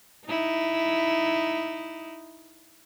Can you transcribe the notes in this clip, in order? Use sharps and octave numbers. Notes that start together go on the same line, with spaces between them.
D#4 E4